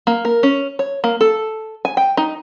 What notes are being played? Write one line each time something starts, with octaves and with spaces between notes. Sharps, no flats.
A#3
A#4
C#4
C#5
A#3
A4
G#5
G5
D#4